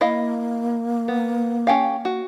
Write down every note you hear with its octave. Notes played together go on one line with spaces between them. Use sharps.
A#3 E4 D#5 F5
B3
C#4 G4 F5
F#4